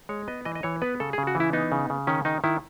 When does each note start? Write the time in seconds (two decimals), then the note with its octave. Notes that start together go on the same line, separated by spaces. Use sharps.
0.09 G#3 C#5
0.28 B3 D#5
0.45 E3 D#5
0.55 D#5
0.63 E3 C#5
0.82 B3 B4
1.00 C#3 A4
1.13 G#4
1.18 C#3
1.27 F#4
1.35 E3
1.40 E4
1.53 B3 D#4
1.72 C#3
1.90 C#3
2.07 D#3 C#4
2.25 D#3 D#4
2.44 D#3 E4